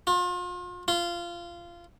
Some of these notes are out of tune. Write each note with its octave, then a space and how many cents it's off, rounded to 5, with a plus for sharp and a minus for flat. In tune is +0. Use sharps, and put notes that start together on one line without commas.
F4 +35
F4 -20